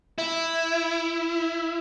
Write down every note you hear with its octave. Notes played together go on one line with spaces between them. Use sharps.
E4